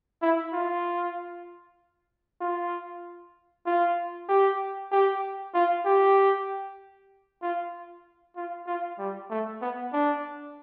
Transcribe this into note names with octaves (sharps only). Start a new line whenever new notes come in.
E4
F4
F4
F4
G4
G4
F4
G4
F4
F4
F4
G3
A3
B3
D4